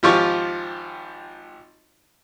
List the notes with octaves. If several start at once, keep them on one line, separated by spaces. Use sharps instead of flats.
G#1 F3 F4 G4 C#6